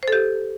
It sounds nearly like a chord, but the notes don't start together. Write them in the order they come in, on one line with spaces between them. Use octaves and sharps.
C5 A4 G4